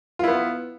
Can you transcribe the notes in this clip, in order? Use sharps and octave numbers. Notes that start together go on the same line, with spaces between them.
B3 E4 F4